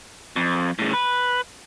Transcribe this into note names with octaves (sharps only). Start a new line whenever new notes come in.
F2
A2 C#3
B4